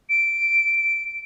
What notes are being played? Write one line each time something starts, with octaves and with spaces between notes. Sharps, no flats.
D7